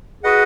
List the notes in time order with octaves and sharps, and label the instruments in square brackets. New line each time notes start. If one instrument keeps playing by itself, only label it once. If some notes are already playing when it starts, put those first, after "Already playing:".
[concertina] F#4 B4 D#5 F#5 [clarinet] G#4